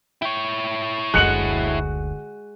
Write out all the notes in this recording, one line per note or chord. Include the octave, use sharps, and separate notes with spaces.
E4 C#5 G5
F#1 D2 G#3 F#4 F#6 C#7 F#7